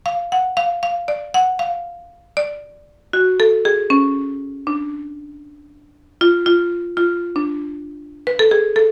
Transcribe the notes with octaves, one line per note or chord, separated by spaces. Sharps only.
F5
F#5
F5
F5
D5
F#5
F5
D5
F#4
A4
G#4
C#4
D4
F4
F4
F4
D4
B4
A4
G#4
A4